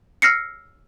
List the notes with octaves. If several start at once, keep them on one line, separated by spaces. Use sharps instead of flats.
E6 F6 A#6 C7 C#7